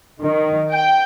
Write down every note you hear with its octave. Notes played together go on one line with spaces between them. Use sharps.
D#3
G5